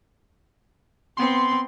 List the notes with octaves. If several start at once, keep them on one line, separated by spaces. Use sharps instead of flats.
B3 C4 C6